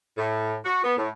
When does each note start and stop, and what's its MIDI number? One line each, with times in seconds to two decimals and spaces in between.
0.18 0.55 45
0.64 0.84 66
0.84 0.94 59
0.98 1.08 45